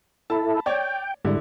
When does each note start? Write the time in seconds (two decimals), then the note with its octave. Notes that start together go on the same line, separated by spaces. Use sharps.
0.30 E4 A4 A5 B5
0.66 C#5 D5 G5
1.25 G#2 D3 G3 E4